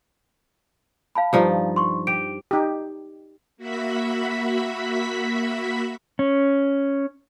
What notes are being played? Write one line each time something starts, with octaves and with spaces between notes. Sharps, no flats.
F5 A5 B5
G2 F3 D#4
C6 C#6
G4 D7
D#4 G4
A#3 F#4 E5 B5 B6
C#4